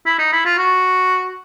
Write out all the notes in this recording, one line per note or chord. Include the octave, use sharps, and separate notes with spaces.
E4
D#4
E4
F4
F#4